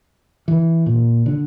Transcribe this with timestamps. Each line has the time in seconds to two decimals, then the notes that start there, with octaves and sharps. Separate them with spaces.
0.48 E3
0.86 A#2
1.26 D3